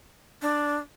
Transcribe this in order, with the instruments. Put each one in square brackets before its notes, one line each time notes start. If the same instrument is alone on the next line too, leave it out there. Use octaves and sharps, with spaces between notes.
[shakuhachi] D4